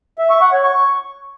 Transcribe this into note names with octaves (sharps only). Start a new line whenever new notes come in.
E5
C#6
F#5
C#5
C#6